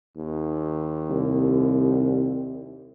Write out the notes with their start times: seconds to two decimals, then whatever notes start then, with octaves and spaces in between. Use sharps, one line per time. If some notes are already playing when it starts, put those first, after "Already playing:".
0.17 D#2
1.10 C2